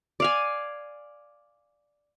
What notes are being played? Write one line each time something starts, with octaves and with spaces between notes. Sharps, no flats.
D5 F5 G#5